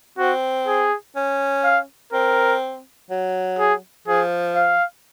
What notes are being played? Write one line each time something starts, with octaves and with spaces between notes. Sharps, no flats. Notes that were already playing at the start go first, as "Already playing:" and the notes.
C4 F#4
G#4
C#4
F5
C4 A#4
F#3
G#4
F3 G#4
F5